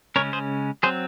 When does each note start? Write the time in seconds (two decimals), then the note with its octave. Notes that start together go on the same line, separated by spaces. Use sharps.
0.16 C#3 G#3 C#4 A#4 C#5
0.33 G#4 C5
0.83 F#3 C4 G#4 C5